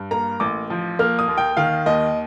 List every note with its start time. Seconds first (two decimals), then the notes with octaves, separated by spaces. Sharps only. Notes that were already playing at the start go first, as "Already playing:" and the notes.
Already playing: G2
0.11 A#3 A#5
0.40 A1 D6
0.70 F3
0.99 A#3 F6
1.19 D#6
1.28 D#2
1.38 G5
1.57 D#3 F5
1.86 D#2 D#5